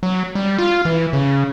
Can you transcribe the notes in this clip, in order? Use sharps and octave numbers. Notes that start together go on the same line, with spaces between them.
F#3
G3
F4
E3
C#3